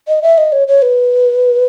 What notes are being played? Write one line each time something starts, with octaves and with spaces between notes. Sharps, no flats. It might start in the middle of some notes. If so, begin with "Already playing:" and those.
D#5
E5
D#5
C#5
C#5
B4